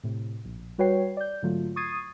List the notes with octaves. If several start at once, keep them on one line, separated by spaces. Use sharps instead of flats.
A2 C3
A#1
G3 F#4 B4 C#5 G5 C7
D5 G6
G#2 D3 F#3 A3 F4
C#6 D#6 G#6 A6 C7 D#7